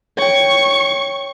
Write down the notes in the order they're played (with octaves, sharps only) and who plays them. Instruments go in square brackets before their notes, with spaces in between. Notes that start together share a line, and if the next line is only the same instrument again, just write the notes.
[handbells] C#5 G5 [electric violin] C#6